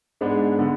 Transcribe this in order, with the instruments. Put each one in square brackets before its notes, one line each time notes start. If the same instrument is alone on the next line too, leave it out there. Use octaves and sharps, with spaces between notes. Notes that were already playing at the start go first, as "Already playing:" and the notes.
[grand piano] G#2 G#3 B3 D4
D3 G#3 B3